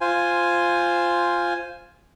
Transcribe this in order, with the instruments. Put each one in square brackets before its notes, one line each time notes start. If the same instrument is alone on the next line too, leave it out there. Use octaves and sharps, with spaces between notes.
[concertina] F4 C5 G#5